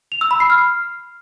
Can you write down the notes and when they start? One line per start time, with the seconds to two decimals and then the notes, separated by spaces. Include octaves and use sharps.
0.12 F7
0.21 E6
0.31 B5
0.40 C7
0.50 F6